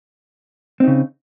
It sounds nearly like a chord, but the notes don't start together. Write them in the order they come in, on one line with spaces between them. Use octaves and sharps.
C4 D#4 C#3